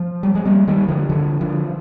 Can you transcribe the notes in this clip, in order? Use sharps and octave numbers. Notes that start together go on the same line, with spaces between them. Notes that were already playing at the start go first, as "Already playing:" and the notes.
Already playing: F3
G3
G#3
G3 A#3
D#3 G3
D3 F3
D3 F3
D3 F3